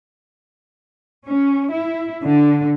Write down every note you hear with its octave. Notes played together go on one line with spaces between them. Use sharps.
C#4
E4
D3